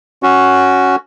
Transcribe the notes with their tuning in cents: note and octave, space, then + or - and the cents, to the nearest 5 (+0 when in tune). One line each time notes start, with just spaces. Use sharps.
C#4 +0 F#4 +0